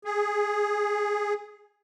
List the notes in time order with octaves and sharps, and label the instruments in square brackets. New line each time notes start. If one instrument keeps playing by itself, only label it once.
[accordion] G#4